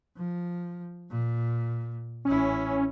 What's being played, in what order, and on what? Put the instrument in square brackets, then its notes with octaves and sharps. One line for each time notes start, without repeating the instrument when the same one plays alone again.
[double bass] F3
A#2
[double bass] A1 E4 [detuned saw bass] C#4